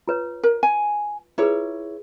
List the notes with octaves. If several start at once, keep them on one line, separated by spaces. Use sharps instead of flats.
F4 B4 C#5
A#4
G#5
E4 F4 G#4 B4 C#5